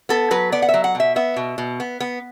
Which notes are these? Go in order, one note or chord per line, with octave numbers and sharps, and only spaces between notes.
B3 A4
F#3 B4
B3 D5
F#5
E5
F#3
F#5
B2 E5
B3 E5
B2
B2
B3
B3